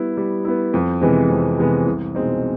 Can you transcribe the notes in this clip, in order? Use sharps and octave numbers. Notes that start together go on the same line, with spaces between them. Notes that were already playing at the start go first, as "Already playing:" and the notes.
Already playing: G3 B3 E4
G3
B3 E4
F2
C3 E3 G#3 B3
F2
C3 E3 G#3 B3
C2
B2 G#3 C4 D#4